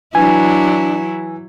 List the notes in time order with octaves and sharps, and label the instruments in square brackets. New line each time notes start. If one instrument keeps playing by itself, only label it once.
[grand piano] E3 [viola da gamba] F#3 E4 [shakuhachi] D4 [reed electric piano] G#5